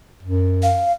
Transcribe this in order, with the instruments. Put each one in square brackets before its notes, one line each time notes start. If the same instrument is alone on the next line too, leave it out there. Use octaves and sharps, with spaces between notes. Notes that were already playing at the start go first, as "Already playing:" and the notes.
[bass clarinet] F#2
[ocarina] F5